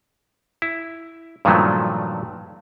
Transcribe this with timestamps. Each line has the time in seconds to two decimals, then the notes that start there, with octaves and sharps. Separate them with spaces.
0.62 E4
1.45 G2 A#2 D#3 F3 F#3 A3